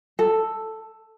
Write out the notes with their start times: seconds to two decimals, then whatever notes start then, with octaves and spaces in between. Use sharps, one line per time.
0.19 A4